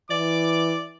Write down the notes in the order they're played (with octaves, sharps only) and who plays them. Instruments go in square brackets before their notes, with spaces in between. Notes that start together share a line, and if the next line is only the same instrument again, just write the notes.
[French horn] E3 [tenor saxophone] D5 [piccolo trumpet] D6